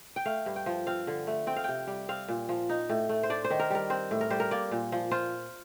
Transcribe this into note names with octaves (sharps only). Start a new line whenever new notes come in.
G5
A3 F5
G2
G5
F3
C4 F5
D3
A3
C4 G5
F5
C3 G5
G3
C4 F5
A#2
F3
D#4
A2
A3
C5
D4 D5
C5
D#3
A#4
G3 A#4
C4 C5
A2
A#4
G3 C5
A#4
A#3 D5
A#2
F3
F4 C5